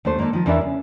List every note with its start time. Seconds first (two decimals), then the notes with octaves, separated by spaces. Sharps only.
0.05 D#2 A3 D4 C5
0.19 D#3 A#3 D4 D#4 A4
0.33 D#3 F3
0.46 E2 E3 D4 A#4 D5 E5
0.61 C#3